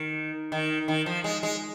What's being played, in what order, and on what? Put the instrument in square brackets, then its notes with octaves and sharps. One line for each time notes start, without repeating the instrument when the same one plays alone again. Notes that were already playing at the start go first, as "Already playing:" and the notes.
Already playing: [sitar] D#3
D#3
D#3
F3
G#3
G#3